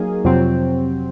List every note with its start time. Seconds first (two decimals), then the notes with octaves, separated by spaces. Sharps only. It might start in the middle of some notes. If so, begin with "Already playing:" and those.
Already playing: F#3 A#3 D#4 G#4
0.25 F2 C3 F#3 C4